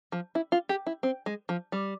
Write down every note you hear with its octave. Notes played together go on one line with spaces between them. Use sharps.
F3
E4
F4
G4
E4
C4
G#3
F3
G3